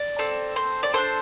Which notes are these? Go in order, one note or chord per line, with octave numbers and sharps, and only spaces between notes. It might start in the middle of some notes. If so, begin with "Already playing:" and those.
Already playing: D5
C4 A4
C5
D5
D4 A4 C5